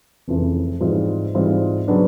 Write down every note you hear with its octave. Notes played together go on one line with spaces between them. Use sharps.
F1 F2 C#3 E3
G#2 E3 G3 C4 F4
G#2 E3 G3 C4 F4
C#3 F#3 B3 D4